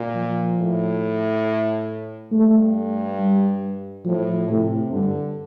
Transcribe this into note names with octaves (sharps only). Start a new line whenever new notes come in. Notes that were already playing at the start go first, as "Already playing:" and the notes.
Already playing: A#2
F3
A2
G2 A3
G3
A2 F3
A2 C3
G2 D3